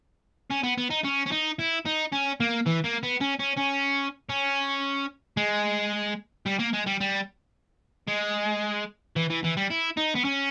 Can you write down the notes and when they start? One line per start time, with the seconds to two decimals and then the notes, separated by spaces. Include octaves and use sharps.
0.51 C#4
0.64 B3
0.78 B3
0.90 D#4
1.04 C#4
1.26 C#4
1.31 D#4
1.59 E4
1.86 D#4
2.13 C#4
2.40 A#3
2.66 E3
2.85 A#3
3.03 B3
3.21 C#4
3.39 C#4
3.57 C#4
4.29 C#4
5.37 G#3
6.46 G3
6.59 A#3
6.73 G#3
6.86 G3
7.00 G3
8.08 G#3
9.16 E3
9.30 E3
9.44 E3
9.57 G3
9.71 E4
9.97 D#4
10.15 B3
10.25 C#4